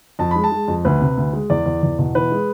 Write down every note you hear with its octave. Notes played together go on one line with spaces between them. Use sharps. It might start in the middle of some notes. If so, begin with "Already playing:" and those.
F2 A5
G#3 B5
A5
G#3
F2
D2 B4
C3
D2
G#3
E2 D5
E2
E2
B2
E3 B4
G#3